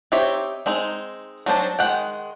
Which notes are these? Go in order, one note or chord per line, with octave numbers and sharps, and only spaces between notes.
C4 D#4 G4 C#5 E5
G#3 C4 D#4
F#3 C4 D4 C5 A5
D#3 G#3 F#5 G5